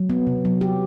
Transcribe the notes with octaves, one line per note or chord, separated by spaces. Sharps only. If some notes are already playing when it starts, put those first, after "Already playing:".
Already playing: F#3
B3
C3
F#3
G4